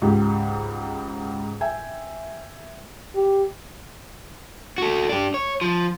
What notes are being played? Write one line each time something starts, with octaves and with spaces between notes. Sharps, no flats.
C#2 G#2 G4
E5 G5 G#5
G4
F#4 A4
D4 G4
C#5
F3